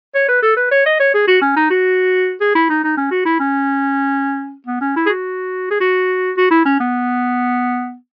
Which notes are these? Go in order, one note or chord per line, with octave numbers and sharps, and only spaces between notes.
C#5
B4
A4
B4
C#5
D#5
C#5
G#4
F#4
C#4
D#4
F#4
G#4
E4
D#4
D#4
C#4
F#4
E4
C#4
B3
C#4
E4
G#4
F#4
G#4
F#4
F#4
E4
C#4
B3